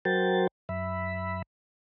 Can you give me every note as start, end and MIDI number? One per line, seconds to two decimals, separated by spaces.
0.05 0.47 54
0.05 0.47 66
0.05 0.47 70
0.05 0.47 72
0.05 0.47 79
0.05 0.47 93
0.69 1.42 42
0.69 1.42 76
0.69 1.42 83